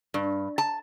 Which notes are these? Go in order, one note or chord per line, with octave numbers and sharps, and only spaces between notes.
G2
A5